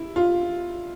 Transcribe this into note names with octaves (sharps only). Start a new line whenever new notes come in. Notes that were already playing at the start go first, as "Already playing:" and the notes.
Already playing: E4
F4